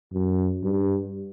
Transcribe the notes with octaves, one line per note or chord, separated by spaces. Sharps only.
F#2
G2